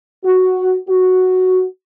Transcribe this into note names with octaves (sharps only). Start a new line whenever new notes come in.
F#4
F#4